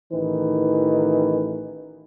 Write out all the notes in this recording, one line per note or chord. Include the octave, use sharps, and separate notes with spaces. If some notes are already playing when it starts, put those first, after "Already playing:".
A1 D#3 E3 B4